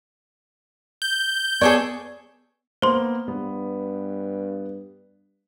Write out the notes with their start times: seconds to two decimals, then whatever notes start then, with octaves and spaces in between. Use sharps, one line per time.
1.02 G6
1.61 B3 G#4 A4 B4 C#5 D5
2.82 A#3 B3 C5 C6
3.28 G2 B3